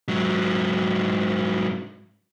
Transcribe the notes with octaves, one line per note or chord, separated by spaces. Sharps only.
G#2 F#3